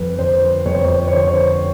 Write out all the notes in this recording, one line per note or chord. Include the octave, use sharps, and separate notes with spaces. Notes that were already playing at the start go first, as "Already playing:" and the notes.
Already playing: F2 B4
D3 C5
F2 C#5
C5
C#5
C5
C#5
D3 C5
C#5